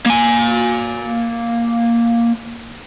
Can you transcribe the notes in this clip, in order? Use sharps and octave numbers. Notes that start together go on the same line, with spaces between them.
A#3 G#5